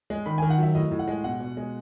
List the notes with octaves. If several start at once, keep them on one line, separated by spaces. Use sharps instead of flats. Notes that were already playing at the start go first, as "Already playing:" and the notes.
G#3
D#3 B5
G#5
D#3
F#5
F#3 E5
A2 D#5
A2
F#5
G#3
B2 F#5
B2
G#3